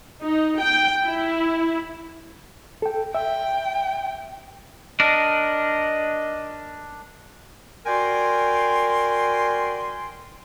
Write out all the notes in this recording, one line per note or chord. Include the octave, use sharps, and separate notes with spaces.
D#4
G5
E4
A4 G5
E5 G5
D4 A#4 D#5
F#4 A#4 D5 G5 G#5 C6